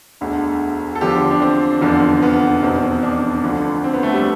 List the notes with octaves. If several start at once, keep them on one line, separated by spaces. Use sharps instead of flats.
E1 D2 D3
A4
E2 D3 F3 G4
D4
C4
F1 E2 D3 F3
B3
F1 E2 B2 C4
D4
D2 D3 F3
C4
B3
A3
G3